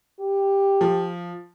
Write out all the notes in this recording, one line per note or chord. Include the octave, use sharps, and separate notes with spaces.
G4
F3